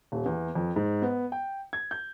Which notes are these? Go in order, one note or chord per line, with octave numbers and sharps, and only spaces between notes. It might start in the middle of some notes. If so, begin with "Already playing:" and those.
D#1
E2
F2
G#2
B3
G5
G#6
G6